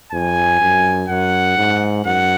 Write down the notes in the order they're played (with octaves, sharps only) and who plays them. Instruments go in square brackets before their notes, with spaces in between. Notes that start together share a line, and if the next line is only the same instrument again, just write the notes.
[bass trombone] F2 [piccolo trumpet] G#5
[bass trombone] F#2
[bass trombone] F#2 [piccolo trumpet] F#5
[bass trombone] G#2
[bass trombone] F#2 [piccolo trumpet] F#5